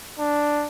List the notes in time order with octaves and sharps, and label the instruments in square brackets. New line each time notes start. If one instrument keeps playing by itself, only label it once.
[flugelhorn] D4